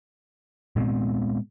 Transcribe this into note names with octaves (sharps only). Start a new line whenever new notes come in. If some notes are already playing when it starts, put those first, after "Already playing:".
A#2 G#3 B3 C4